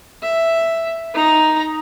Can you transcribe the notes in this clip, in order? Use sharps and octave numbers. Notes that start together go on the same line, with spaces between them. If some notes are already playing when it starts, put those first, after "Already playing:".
E5
D#4 A#5